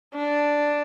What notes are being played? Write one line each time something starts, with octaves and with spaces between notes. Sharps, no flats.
D4